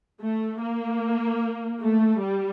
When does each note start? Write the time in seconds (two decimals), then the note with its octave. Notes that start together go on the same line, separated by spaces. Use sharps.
0.22 A3
0.61 A#3
1.81 A3
2.21 G3